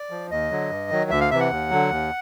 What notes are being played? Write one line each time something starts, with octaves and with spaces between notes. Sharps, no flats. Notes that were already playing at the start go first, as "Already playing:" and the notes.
Already playing: D5
F3
D#2 D#5
D3 F#3
G2
D#3 F#3
D2 E5
F5
C3 E3 E5
F#5
D#2
D3 F#3
D#2